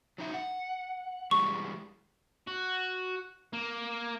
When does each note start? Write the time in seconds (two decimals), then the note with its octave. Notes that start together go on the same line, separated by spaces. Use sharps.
0.18 F#3 D#4 E5
0.34 F#5
1.31 E3 G3 G#3 C#6
2.48 F#4
3.53 A#3